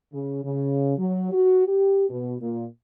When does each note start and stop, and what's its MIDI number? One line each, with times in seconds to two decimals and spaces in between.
0.13 0.43 49
0.45 0.93 49
0.98 1.30 54
1.32 1.66 66
1.67 2.06 67
2.10 2.36 47
2.41 2.66 46